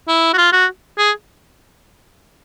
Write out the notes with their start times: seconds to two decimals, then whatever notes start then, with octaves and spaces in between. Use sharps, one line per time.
0.08 E4
0.33 F#4
0.38 F4
0.53 F#4
0.98 G#4